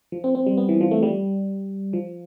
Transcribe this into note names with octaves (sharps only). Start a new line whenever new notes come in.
F3
C4
C4
G3
B3
E3
F3
A3
G3
F3